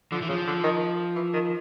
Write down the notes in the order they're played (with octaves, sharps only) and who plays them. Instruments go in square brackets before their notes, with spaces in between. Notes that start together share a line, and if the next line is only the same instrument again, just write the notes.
[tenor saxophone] D3 [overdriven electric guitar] F3
[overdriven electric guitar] E3
[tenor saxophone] C#3 [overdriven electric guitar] F3
[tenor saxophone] D3
D#3
E3
D#3